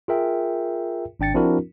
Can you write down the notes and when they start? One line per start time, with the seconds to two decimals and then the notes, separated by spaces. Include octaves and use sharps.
0.08 F4 G#4 A#4 E5 G5
1.20 G#1 D4 G5 A6 C#7
1.34 F3 C4 D4 E4 F#4 A#4